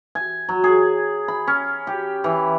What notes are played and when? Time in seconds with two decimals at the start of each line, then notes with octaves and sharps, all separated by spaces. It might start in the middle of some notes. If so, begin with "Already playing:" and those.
0.15 G#5
0.49 F#3
0.64 G#4
1.28 B5
1.47 C#4
1.87 G4
2.24 E3